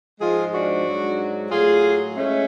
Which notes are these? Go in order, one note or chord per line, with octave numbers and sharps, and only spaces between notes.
G#2 F3 G#3 F4 G#4
D4 F#4
G#2 F#3
A2 F#3 F4 G#4
G#3 A3 C#4